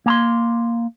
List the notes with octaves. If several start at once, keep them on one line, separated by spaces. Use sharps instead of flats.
A#3 A#5 C6